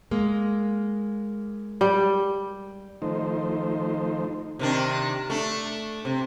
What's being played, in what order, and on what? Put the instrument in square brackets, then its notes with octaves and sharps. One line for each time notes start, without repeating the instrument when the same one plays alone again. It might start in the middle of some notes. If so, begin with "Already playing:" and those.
[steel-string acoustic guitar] G#3 A#3
[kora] G3
[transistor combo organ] D#3 F3 A3 D#4 C5
[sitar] C3 D#3 D4
A3 D4
C3